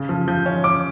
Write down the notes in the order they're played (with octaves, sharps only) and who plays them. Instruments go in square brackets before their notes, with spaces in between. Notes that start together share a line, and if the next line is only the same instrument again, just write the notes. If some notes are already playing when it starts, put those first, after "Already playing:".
Already playing: [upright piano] C#3
F3
[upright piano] F3 [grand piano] G6
[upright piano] C#4
[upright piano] C#4 [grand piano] D6